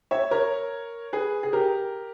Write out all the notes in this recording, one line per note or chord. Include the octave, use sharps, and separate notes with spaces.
C#5 E5
A#4 C#5
G#4 B4
G#4
G4 A#4